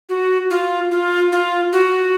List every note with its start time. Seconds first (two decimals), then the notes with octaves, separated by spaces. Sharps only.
0.09 F#4
0.50 F4
0.91 F4
1.32 F4
1.73 F#4